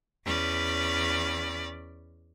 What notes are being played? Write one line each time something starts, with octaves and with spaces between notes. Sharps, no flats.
E2 C#4 D5 B5